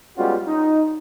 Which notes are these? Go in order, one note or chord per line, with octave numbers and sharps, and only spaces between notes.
G3 G#3 B3 C#4 F4 F#4
D#4